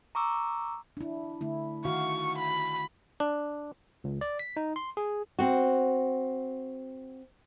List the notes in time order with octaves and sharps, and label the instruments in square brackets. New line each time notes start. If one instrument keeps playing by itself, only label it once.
[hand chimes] A#5 C#6 D6 E6
[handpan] D4 E4
D3 A3 E4
[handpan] D#3 F#4 F5 [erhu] C#6
[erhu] B5
[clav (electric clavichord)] D4
[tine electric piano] C#2
D5
B6
D#4
C6
G#4
[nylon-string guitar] C4 F#4